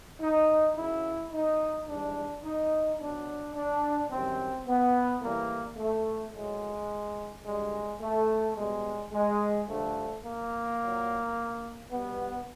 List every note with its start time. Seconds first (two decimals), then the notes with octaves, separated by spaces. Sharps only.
0.21 D#4
0.77 F#2 C#3 F#3 E4
1.33 D#4
1.88 G#2 E3 G3 D4
2.44 D#4
3.00 B2 F#3 D4
3.56 D4
4.11 F#2 D#3 G3 C4
4.68 B3
5.23 A2 E3 G3 A#3
5.79 A3
6.34 A2 F#3 G#3
7.45 F2 D3 G3 G#3
8.02 A3
8.57 B2 G3 G#3
9.13 G#3
9.68 G2 D3 F3 A3
10.25 A#3
10.81 A#2 F#3
11.91 B2 G3 B3